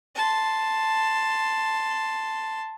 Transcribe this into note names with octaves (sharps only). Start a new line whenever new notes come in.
A5 C6